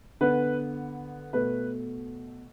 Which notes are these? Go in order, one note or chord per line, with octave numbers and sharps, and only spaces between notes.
D3 B3 B4
B2 A3 B4